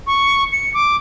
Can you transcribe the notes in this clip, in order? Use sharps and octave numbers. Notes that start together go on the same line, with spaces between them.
C#6
C#7
D6